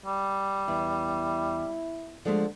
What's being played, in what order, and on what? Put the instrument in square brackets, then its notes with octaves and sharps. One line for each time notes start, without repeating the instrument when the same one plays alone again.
[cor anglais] G3
[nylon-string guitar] E2 [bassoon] E4
[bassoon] D3 [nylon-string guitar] F3 G#3 A3